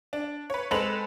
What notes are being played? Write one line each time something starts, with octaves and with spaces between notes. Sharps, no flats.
D4
B4 C#5
G#3 C4 A4 B4 F7 F#7